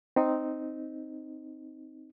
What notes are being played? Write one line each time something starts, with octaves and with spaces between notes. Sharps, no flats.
C4 D#4